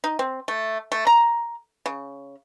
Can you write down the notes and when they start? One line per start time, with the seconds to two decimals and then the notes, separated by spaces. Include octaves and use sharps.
0.04 D#4
0.19 C4
0.48 A3
0.92 A3
1.07 A#5
1.86 C#3